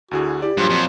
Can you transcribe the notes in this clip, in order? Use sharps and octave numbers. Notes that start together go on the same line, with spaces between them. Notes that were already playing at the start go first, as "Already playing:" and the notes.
D2 D3 E4 F#4 G#4
E4 G4 D5
G2 A#2 F3 F#3 C6
F2